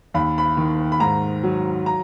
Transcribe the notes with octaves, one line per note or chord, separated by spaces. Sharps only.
D#2 B5
B5
D#3
B5
G#2 A#5
F#3
A#5